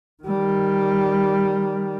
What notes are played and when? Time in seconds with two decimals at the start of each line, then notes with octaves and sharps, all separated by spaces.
0.23 D#3 G3